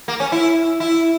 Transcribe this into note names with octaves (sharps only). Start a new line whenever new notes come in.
A#3
C#4
E4
E4